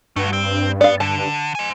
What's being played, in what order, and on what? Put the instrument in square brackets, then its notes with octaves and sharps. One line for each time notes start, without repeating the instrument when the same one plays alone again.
[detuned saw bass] G2 [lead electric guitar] A3 F#4
[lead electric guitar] C4
[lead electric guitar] B3 [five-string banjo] D5 F5
[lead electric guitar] D3 [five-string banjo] A5
[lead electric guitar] C5 G#5